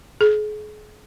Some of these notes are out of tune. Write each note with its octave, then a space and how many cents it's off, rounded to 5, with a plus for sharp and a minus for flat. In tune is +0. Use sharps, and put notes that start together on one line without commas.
G#4 +35